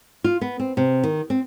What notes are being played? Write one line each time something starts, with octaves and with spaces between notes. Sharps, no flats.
F4
B3
C4
C3
D#3
C4